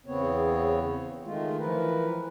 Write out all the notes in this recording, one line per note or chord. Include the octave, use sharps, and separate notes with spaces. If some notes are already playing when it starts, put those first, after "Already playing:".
E2 C#3 B3 C4 C#5
D#3 G#3 A3 F4
E3 F3 A#4 B4